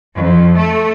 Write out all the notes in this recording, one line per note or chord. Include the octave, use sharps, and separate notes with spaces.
F2
A3